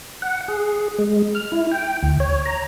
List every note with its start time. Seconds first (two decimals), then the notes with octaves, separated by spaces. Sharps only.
0.22 F#5
0.48 G#4
0.98 G#3
1.35 F6
1.52 E4
1.72 G5
2.03 D2
2.20 C#5
2.46 A#5